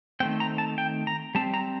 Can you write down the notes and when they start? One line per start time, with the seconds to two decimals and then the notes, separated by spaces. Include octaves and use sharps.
0.20 D#3 A3 C4 G5
0.40 A#5
0.58 A5
0.78 G5
1.07 A#5
1.35 G3 C4 A5
1.54 A#5